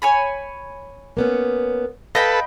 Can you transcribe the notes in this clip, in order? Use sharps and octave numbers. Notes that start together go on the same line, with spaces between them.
C#5 G#5 B5
A#3 B3 C#4
A4 B4 D#5 F5 G5 B5